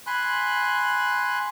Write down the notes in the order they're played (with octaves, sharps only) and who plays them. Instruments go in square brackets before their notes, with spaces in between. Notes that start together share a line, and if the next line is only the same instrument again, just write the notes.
[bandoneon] G#5 B5 C6 F#6